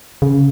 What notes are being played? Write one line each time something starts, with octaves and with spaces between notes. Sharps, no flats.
C#3